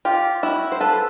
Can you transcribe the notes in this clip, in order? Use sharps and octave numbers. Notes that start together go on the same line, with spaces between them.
F4 G4
E4 F#4
C5
A4 B4